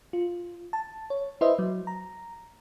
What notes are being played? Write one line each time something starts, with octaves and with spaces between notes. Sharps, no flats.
F4
A5
C#5
E4 B4 C5 D#5 E5
F#3
A#5